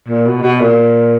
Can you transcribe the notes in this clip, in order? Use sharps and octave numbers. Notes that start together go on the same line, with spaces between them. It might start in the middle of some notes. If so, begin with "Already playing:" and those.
A#2
B2
B2
A#2